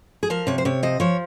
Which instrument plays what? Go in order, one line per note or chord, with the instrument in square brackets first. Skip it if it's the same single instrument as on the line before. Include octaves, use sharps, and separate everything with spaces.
[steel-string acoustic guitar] G#4
F3 A#4
C3 C#5
C5
C3 C#5
F3 D#5
F3 C#5